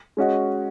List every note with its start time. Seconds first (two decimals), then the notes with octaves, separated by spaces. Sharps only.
0.17 G#3 C#4 F#4 D#5